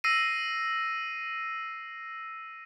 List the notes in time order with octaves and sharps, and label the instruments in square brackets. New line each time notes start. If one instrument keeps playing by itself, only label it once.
[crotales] E6 A#6 C7 D#7